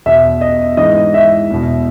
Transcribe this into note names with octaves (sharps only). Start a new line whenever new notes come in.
E2 B2 E5
D#5
G#2 E3 D#5
E5
E2 B2